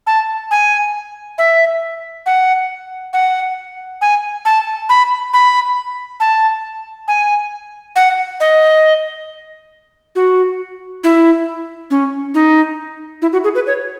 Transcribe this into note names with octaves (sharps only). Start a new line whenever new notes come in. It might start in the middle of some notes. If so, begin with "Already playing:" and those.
A5
G#5
E5
F#5
F#5
G#5
A5
B5
B5
A5
G#5
F#5
D#5
F#4
E4
C#4
D#4
E4
F#4
G#4
B4
C#5